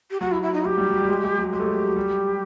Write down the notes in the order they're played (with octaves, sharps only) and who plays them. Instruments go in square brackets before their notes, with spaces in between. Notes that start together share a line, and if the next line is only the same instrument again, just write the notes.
[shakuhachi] G4
[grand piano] F#3 [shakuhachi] F#4
[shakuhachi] E4
E4
D#4
[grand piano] F#3 [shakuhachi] G4
[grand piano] G3
F#3
G3
G#3
G#3
F#3
[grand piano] G#3 [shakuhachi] G4
[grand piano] A3
G#3
F#3
G3